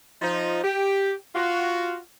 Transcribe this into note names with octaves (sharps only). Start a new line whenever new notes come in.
F3 D#4
G4
F4 F#4